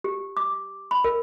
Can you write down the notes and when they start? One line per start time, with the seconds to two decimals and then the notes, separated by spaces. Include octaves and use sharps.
0.04 G4
0.37 D6
0.91 B5
1.04 A#4